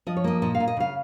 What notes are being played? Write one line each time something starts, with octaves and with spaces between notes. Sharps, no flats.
F3 D#5
C#5
A#3 D#5
A#2 D#5
F5
A#2
D#5
C#3 F5